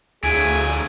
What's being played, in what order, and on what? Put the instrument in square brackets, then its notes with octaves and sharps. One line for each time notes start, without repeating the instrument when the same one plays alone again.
[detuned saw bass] D2 [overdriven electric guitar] A2 F3 [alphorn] G#4 [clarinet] G#5